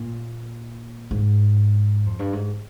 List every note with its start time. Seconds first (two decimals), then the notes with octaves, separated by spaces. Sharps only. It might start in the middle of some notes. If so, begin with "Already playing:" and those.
Already playing: A#2
1.11 G#2
2.06 F2
2.19 G2
2.33 G#2